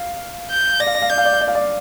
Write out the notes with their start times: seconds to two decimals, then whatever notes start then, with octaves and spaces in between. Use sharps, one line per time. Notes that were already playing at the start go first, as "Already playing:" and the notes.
Already playing: F5
0.50 G6
0.80 D5 A#6
0.87 F5
0.95 D5
1.02 F5
1.09 D5 G6
1.18 F5
1.25 D5
1.33 F5
1.41 D5
1.48 F5
1.55 D5